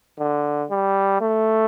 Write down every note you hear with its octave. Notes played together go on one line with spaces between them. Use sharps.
D3
G3
A3